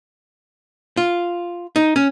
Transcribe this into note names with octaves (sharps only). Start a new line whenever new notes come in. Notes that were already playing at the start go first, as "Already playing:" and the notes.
F4
D#4
C#4